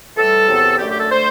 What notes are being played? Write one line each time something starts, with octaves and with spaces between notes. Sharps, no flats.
A2 E3 G3 A4
E2 C3 F#3 B3
F#2 D3 A3 G4
G4
A4
D3 A3 C5